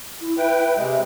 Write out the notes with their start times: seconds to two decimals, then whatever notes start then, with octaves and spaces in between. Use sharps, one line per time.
0.21 E4
0.38 B4 E5 G5
0.77 C3 G#3